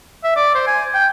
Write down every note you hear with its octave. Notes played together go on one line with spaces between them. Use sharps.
E5
D5
C5
G#5
G5